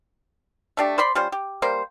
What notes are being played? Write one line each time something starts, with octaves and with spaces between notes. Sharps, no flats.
A3 D4 G4
C5 D5 B5 C6
G3 C#4 F4 C5
G4
G3 A#3 C5